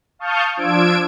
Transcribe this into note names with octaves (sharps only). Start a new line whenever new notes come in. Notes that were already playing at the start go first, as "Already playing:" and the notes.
F5 A5 C#6 D#6 F6 G6
F3 D4 F4 E6 G#6 D7